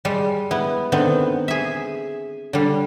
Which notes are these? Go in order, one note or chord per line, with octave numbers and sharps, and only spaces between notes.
G3 G#3
B3 E4
D3 D#3 B3 C4
G#4 E5
D3 G3